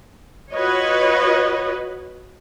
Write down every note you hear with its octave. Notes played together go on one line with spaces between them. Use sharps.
F4 F#4 B4 C#5 D#5